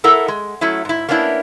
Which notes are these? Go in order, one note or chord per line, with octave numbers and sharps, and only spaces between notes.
E4 A4 A#4 F#5
G#3
F#3 A3 C#4 E4
G#2 E4
A#3 B3 C#4 D4 E4